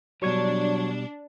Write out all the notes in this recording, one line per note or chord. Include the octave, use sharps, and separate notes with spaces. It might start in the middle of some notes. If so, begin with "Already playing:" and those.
B2 F#3 G3 D4 C#6 G#6